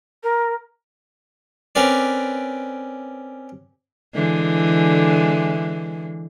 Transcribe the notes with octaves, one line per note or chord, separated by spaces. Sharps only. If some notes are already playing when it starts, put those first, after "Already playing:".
A#4
C4 C#4 A#4 B4 D5
D3 E3 G#3